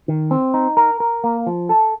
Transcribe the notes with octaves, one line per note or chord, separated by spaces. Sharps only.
D#3
C4
D#4
A#4
A#4
A#3
F3
A4